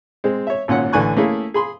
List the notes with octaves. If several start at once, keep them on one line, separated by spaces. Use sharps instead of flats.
G#3 C4
C#5 E5
G#1 A#2 C#4 C#5 F#5
A1 D3 E3 G#5 C#6 F#6
A3 A#3 C#4 E4 G#4
G#4 B5 C6